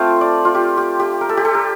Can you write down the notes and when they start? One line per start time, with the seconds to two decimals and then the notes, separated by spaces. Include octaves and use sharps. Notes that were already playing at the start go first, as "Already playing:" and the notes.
Already playing: A3 C4 F4 F5 G5 A5
0.21 D5
0.45 F4
0.55 G4
0.77 G4
1.00 G4
1.21 A#4
1.29 A4
1.37 G4
1.45 A4
1.55 A#4